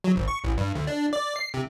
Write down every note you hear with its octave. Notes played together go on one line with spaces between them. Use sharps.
F#3
G#1
C#6
A1
G2
D2
D4
D5
C7
C3